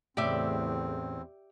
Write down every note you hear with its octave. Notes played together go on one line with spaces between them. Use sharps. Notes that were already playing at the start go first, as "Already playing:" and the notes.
E2 A2 C#3 C4 G4 D5 E5